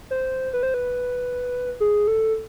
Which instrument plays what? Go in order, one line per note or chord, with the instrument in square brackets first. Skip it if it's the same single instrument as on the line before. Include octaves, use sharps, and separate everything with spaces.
[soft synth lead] C5
B4
C5
B4
G#4
A4